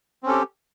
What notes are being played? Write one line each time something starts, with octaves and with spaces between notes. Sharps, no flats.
C4 C#4 G4 A4